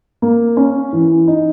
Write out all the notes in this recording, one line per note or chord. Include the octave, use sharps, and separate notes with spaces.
A#3
C#4
E3
D#4